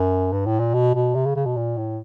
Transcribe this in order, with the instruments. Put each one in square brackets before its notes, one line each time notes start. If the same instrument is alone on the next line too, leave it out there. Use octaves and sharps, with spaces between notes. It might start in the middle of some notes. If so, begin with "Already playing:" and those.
Already playing: [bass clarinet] F#2
G2
A2
A#2
B2
B2
C3
C#3
C#3
B2
A#2
A2